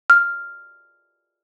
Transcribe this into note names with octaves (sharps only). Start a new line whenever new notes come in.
F6